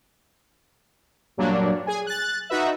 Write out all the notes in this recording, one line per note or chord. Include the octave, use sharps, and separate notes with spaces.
G2 A#2 F#3 G3 A#3 D4
G#4 G#5
F#6 A6
D#4 F#4 B4 E5